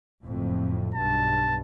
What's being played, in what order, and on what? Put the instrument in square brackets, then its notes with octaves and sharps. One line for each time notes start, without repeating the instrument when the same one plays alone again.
[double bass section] F#1 F2 A2
[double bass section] B1 G2 B2 [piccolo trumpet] A5